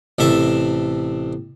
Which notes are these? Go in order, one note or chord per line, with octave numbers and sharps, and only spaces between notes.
A1 C3 A4 E5 A5